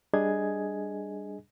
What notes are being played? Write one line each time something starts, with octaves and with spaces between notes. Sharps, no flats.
G3 D4 G#4 D#5 G#5 G#6